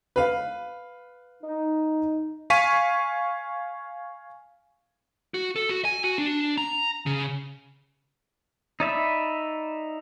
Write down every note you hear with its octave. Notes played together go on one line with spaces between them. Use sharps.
B4 F5
D#4
F5 G#5 C#6 B6 D#7
F#4
A4
F#4
G#5
F#4
D4
A#5
C#3
D#4 D5 E5 B5